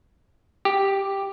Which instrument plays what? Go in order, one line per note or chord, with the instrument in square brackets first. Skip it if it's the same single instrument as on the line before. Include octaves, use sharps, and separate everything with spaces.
[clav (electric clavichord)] G4